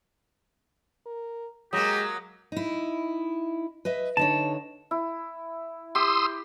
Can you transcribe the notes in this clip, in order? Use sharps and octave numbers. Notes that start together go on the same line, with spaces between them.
A#4
F#3 G#3 A#3 G4 D#6 A#6
D#4 E4
B4 D#5 E5
D3 D#4 C#5 A5
E4
G4 C6 D#6 E6